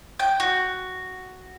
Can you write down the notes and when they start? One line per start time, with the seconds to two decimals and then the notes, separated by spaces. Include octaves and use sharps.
0.19 G5
0.40 F#4